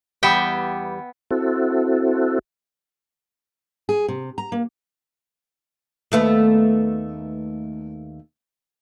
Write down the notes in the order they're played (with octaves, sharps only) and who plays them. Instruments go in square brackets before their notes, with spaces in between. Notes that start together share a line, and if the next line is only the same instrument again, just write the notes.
[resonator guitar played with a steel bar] E2 G3 G4 [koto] B3 E5 G5
[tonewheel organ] C4 E4 F#4 A4
[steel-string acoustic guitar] G#4
C3
A#5
A#3
[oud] D#2 A3 B3